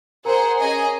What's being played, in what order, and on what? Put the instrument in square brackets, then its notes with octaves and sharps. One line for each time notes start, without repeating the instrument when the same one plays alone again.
[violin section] G#4 C5 F#5 [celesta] A#4 A#5
[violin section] C#4 G#4 D#5 G#5